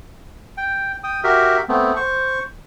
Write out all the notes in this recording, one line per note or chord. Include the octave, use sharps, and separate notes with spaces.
G5
G5 D#6
F#4 G4 A#4 E5
A3 B3 C4
C5 C#6